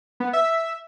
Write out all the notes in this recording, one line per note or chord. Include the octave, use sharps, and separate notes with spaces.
B3
E5